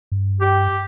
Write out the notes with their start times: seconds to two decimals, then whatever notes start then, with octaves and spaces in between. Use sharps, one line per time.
0.12 G2
0.40 G4